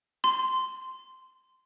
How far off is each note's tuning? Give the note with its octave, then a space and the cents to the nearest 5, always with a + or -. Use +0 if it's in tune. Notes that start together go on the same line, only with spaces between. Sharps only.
C6 -10